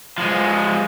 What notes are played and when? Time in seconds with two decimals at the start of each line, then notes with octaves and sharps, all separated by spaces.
0.18 F3 G#3